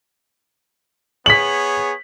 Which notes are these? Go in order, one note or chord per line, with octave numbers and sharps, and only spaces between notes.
B3 G#4 C#5 B6 F#7